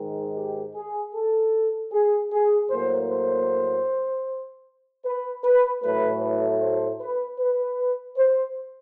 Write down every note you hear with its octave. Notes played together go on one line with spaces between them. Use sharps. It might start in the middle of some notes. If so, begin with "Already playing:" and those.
Already playing: G#2 D#3 G#3
G4
G#4
A4
G#4
G#4
A2 F#3 A#3 C5
C5
B4
B4
A2 F#3 A3 B4
B4
C5
B4
B4
C5